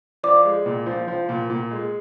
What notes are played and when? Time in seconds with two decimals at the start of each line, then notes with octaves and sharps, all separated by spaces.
0.23 F3 D5 D6
0.44 G#3
0.66 A#2
0.86 F3
1.08 F3
1.29 A#2
1.50 A#2
1.71 G#3